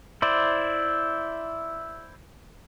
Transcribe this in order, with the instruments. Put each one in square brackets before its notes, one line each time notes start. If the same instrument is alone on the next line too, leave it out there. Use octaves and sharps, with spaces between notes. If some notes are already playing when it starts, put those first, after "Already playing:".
[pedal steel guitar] E4 C5 D5